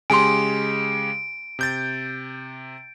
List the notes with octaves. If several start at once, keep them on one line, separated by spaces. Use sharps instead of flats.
C#3 G#3 G4 G#5 C6 D7
C3 G6 A6